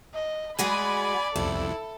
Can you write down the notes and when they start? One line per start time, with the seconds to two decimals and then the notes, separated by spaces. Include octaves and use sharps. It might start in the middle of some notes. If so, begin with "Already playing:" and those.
0.14 D#5
0.59 G#3 F#4 G#4 D5 G#5 B5
1.36 C2 F2 E4 A4